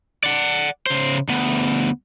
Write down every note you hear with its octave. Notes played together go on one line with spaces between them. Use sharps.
D5 F#5
C#3 C5
D2 B3